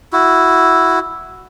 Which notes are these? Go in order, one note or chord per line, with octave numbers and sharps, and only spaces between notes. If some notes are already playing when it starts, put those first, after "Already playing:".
E4 F#4